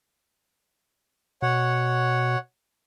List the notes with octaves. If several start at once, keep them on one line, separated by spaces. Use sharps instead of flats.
B2 C#5 F#5